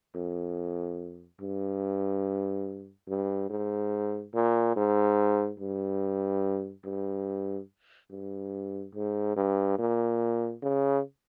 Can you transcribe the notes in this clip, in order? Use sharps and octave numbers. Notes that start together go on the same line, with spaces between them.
F2
G2
G2
G#2
A#2
G#2
G2
G2
G2
G#2
G2
A#2
C#3